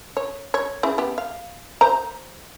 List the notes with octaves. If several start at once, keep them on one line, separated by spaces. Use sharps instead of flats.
C#5
C#5
C#3 E3
B3 G4
F5
C5 A#5